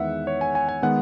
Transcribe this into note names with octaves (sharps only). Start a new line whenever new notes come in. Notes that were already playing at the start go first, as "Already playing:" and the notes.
Already playing: E2 D#3 G#3 B3 E5 F#5
C#5
G#5
G#5
G#5
D#3 G#3 B3 F#5